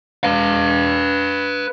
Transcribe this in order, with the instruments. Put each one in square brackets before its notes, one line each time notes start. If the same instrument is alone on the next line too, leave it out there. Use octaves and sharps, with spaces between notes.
[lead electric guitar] B4 F5